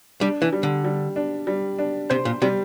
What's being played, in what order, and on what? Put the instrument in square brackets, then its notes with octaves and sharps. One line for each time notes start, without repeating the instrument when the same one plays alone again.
[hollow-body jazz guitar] G3 [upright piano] D4
[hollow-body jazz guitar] E3
[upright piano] G3
[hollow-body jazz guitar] D3
[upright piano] G3
D4
G3
D4
[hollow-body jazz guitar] C3 [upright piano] C5
[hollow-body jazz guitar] A#2
[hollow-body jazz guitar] C3 [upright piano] G3